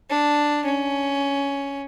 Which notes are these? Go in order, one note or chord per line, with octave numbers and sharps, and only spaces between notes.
D4
C#4